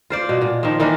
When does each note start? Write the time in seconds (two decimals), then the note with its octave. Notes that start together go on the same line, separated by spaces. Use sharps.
0.10 F4 C5 D5
0.29 B2
0.42 A#2
0.63 D#3 F3
0.80 D#3 E3 A#3 D4